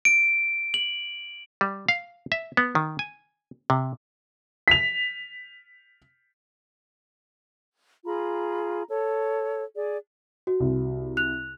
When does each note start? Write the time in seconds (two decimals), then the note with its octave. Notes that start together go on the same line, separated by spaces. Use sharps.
0.05 D7
0.74 F#7
1.61 G3
1.89 F5
2.32 E5
2.57 B3
2.75 D#3
2.99 G#5
3.70 C3
4.68 B6 F7
8.05 F4 G#4 A#5 B5
8.88 A4 C#5
9.76 G#4 D5
10.47 F#4
10.60 C2
11.17 F#6 F7